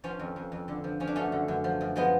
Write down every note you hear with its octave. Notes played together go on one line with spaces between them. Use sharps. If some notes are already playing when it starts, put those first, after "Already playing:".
F3 C#4 F4
F2
F2
F2
D3
F3
F3 C#4
D4
F#2 A3 C#4
D3
F#2
F3
F#2
F3 G#3 B3